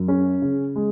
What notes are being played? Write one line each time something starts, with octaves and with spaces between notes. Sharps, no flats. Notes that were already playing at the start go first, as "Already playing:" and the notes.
Already playing: F#2
C#4
C#3
G#3